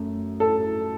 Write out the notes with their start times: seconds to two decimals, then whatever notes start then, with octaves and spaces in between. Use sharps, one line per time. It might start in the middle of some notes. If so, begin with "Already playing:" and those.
Already playing: F#2 A3
0.40 A4